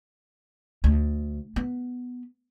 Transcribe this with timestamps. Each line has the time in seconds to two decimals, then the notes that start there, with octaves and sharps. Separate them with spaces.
0.84 D2
1.56 B3